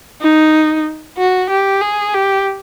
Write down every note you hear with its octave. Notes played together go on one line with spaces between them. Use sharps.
D#4
F#4
G4
G#4
G4